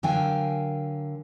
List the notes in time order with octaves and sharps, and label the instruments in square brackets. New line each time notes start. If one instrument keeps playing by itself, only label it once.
[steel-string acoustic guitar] D3 F#3 A#4 F5 G5 G#5